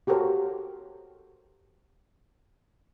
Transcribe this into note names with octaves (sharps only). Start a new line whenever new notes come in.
F#4 G4 A4 A#4 C5 C#5